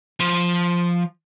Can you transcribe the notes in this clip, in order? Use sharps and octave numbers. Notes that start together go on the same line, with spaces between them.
F3